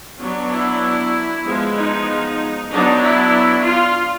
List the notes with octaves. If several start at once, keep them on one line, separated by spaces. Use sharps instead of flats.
F#3 B3 D4
E4
F3 G#3 B3
D#4
F#3 B3 D4 D#4
E4
F4